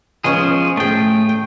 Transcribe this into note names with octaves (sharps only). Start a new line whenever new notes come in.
F3 G#3 B3 C#4 G#4
A2 A3 G#4 G5
G5